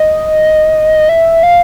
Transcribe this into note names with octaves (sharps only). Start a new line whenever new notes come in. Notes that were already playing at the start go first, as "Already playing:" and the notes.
Already playing: D#5
E5
F5